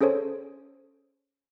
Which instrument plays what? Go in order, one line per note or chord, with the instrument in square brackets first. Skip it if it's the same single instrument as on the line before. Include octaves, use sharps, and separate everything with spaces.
[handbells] C#4 G#4 A4 C5 C#5